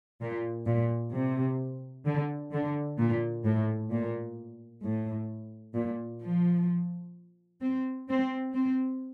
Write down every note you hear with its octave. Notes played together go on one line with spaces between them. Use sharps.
A#2
A#2
C3
D3
D3
A#2
A2
A#2
A2
A#2
F3
C4
C4
C4